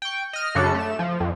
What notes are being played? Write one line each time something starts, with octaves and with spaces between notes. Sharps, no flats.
G5 C#6
D#5 F6
F#2 C#3 D4 F#4 A4 C#7
A3 E7
F3
F2